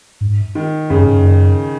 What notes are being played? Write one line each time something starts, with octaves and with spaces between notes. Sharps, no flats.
G#2
D#3
F#2 C#3
G#2
F#2